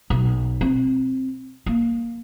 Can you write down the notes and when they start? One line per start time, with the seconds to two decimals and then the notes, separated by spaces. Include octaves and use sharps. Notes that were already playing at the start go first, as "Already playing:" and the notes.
0.10 B1
0.61 C4
1.66 A#3